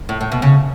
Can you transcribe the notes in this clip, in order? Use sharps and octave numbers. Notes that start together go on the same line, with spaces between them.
A2
A2
B2
C#3